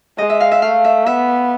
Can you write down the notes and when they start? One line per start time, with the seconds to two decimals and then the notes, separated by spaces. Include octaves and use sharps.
0.18 G#3 D#5
0.30 E5
0.40 F5
0.52 E5
0.62 A3 F5
0.85 E5
1.06 B3 E5